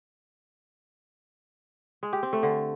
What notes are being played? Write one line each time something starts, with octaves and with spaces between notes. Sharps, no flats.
G#3
G4
C4
A3
D3